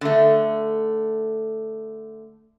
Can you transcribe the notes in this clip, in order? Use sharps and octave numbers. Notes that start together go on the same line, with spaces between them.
D3 A3